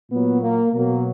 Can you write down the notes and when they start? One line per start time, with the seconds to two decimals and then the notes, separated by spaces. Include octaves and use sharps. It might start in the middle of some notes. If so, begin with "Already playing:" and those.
0.11 A#2 F#3 B3
0.41 A#3
0.73 B2 F#3 A#3